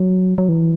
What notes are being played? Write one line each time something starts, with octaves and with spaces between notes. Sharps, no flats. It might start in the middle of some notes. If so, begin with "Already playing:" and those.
Already playing: F#3
F#3
E3